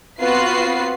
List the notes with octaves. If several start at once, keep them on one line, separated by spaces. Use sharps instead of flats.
B3 C4 F4 F#4 B4 C7